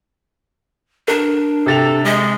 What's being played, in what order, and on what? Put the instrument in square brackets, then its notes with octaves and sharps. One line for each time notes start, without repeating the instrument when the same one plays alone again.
[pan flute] D4 [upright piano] A#4
[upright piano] C3 A6 F7 [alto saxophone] A4
[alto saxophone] G#3 [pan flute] D#5